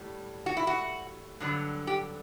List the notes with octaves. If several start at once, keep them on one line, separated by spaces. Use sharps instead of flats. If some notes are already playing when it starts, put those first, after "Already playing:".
Already playing: A2 G3
F#4
E4
F#4
G2 D3 F#3
G4